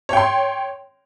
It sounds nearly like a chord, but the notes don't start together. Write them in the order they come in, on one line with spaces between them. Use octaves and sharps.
C#5 G5 C6